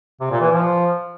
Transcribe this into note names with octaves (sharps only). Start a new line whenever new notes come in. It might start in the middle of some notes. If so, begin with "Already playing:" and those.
C3
A#2
E3
F3